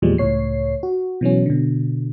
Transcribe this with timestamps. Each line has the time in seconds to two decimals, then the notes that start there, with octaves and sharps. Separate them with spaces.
0.02 E2 A#2 F3 G3 G#3
0.18 C#2 A2 C#5 C7
0.83 F#4
1.21 B2 E3 F#3 C#4
1.46 B2 D3